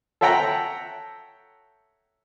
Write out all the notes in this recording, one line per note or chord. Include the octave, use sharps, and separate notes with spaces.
A4 C#5 E5 F#5 G5 A#5